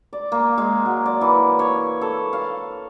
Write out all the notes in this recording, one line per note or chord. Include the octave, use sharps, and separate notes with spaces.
D5
A#3
G#3
F#3
D5
E3
C#5
A4
F5